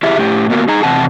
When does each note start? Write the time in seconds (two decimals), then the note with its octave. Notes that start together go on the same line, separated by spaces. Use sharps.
0.03 E4 G4 G#4 E5
0.19 A2 G4
0.50 A#3 B3 F#4 A#4
0.68 D#4 G#4 A#5
0.83 E2 C3 F#5 A5